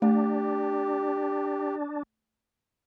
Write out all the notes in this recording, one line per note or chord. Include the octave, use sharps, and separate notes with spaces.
A3 D4 G4